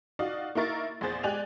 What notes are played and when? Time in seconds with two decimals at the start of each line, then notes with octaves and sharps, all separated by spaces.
0.19 D#4 F#4 D5 F5 D#6
0.55 A#3 D#4 E4 A#4 C#6 A6
1.01 A#1 E2 G#4 C5 A6
1.23 G#3 G4 D5 G#5 F#6 F7